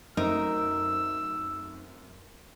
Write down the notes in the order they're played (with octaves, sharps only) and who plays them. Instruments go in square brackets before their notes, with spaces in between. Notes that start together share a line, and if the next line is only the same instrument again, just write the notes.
[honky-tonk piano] F#2 A3 C4 [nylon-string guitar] D#4 [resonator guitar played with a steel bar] A#4 [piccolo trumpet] E6